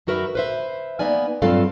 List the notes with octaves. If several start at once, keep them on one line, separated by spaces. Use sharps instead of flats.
F#2 D#4 F#4 A#4 B4 E5
B4 C5 E5
A#3 B3 D#4 D5 G#5
G2 F#3 C4 F4 A4 F5